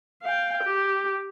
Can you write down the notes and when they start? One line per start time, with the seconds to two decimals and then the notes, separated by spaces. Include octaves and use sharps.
0.23 F5 G5
0.64 G4